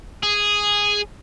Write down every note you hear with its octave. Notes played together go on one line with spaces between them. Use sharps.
G#4